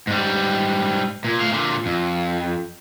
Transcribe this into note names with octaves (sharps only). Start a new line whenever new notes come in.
G#2 G3
A#2
A3 F5
A#2 D3
F2